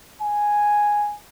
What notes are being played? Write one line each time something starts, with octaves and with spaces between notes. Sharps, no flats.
G#5